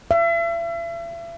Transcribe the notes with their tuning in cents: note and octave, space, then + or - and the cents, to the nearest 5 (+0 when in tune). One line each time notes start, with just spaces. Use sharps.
E5 +40